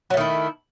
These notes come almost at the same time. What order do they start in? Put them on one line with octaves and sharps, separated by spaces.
F#3 A3 D#3 E4